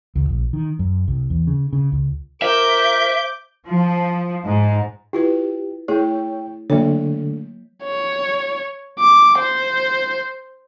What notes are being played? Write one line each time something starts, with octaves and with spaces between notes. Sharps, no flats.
C#2
A#1
D#3
F#2
C2
E2
C#3
C#3
C#2
F4 A#4 C5 E5 D6 G6
F3
G#2
E4 F4 G4 B4
A3 E4 G#4 C#5 G5
D3 F#3 A3 A#3 C#5
C#5
D6
C5